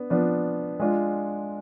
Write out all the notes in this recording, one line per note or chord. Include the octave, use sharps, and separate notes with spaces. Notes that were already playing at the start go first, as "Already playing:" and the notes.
Already playing: B3 D4
F3 B3 D4
G#3 D4 F4